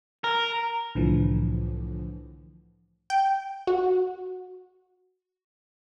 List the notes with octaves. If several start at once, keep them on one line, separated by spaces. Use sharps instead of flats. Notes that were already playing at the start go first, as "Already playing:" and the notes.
A#4
C2 A2 D3 E3 F3
G5
F#4